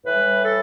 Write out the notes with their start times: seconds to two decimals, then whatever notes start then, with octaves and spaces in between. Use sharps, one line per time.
0.05 A2 E3 G3 B4
0.45 A4